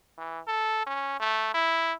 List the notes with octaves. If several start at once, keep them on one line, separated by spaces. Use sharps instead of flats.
E3
A4
C#4
A3
E4